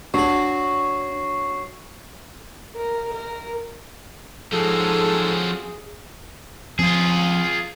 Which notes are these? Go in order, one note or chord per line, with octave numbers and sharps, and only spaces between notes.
F#3 D4 F#4 C#6 C7
A#4
A#4
G#2 F3 F#3 C4 D#4 G#4 A4
F3 C4 F4 G#4